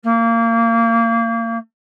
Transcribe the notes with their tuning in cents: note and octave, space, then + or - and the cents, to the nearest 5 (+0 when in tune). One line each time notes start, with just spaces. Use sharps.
A#3 -25